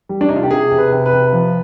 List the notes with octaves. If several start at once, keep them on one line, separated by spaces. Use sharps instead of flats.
G3
D4
C3 D#4
F4
G4
C3 G#4
C3
B4
C3
B4
C3
F3